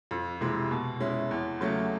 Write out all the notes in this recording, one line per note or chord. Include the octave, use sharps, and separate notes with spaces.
F2
C3 E3 G#3
B2
G#3 C#4 E4
E2
C#3 F#3 A3 C#4